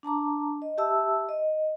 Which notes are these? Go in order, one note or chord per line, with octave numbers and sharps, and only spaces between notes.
D4 A5 A#5 D6
D#5
G4 E5 A5 E6
D#5